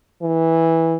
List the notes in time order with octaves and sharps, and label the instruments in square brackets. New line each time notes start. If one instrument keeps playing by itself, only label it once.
[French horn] E3